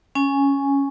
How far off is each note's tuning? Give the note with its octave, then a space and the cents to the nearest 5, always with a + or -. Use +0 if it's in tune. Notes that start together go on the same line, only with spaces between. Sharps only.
C#4 +0 G#5 +0